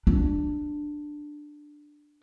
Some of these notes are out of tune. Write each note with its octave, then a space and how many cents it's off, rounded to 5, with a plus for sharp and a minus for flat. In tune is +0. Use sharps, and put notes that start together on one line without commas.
D4 +10